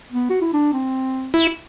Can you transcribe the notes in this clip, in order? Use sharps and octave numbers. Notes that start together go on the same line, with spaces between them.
B3
F#4
E4
D4
C4
E4